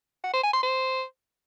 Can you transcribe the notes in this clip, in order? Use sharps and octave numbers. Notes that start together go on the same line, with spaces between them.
F#5
C5
G#5
C6
C5